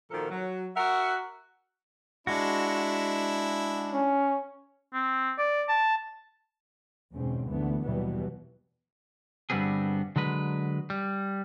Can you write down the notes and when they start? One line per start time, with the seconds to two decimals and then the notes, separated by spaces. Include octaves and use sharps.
0.11 A#2 D#3 F3 F#4 A4 A#4
0.30 F#3
0.76 F#4 A#4 E5 F#5
2.27 G#3 D4 E4 F#4
3.92 C#4
4.94 C4
5.38 D5
5.68 A5
7.12 E2 G#2 B2 D3 C4 C#4
7.47 D2 D3 E3 A3 B3
7.83 D#2 B2 E3 F#3 G3 B3
9.50 G2 D3 G3 B3 C4 G#4
10.16 D3 F#3 G#3 B4
10.90 G3